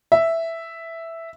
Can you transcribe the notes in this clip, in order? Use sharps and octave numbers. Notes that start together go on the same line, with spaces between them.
E5